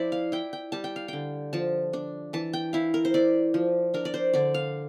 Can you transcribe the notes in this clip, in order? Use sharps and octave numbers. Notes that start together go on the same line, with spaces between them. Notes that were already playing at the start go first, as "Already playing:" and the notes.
Already playing: F3 E4 C5 D5
F5
E4 G5
G5
G3 A5
G5
F5
D3 G5
F3 A5
D4
E3 A5
G5
E4 F5
A#4
C5
E4 D5
F3
D4 A#4
D5
C5
D3 D5
F5